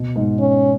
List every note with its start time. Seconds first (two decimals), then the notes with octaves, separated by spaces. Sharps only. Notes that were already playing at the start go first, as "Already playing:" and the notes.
Already playing: B2
0.16 G#2
0.40 C#4